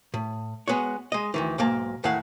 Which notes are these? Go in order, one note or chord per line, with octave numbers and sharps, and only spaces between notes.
A2
G#3 B3 F#4 C#5
G#3 D#5
D2 D#3 E3
B1 G#2 A#3 A5
E2 A2 D#3 E4 F5 F#5